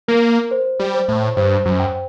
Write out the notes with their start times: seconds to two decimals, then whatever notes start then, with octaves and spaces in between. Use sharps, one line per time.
0.08 A#3 A#4
0.51 C5
0.80 G3
0.94 C5
1.09 A2
1.37 G2 C5
1.65 F#2
1.79 G5